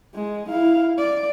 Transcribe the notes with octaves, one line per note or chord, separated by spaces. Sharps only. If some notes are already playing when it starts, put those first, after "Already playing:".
G#3
E4 F5
D5